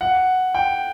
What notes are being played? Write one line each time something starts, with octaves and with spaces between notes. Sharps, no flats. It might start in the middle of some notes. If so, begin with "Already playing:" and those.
F#5
G5